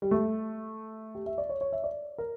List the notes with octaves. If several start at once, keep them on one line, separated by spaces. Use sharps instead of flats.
G3
A3
G4
E5
D5
C#5
C#5
E5
D5
A#4